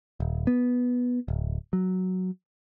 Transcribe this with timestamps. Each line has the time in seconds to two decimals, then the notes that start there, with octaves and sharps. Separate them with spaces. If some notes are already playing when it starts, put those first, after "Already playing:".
0.20 D#1
0.47 B3
1.28 D1
1.73 F#3